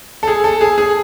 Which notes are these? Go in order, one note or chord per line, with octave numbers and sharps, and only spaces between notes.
A4
G#4
A4
G#4
G#4